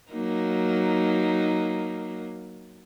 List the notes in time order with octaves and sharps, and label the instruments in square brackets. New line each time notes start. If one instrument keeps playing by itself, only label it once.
[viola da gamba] F#3 A#3 D#4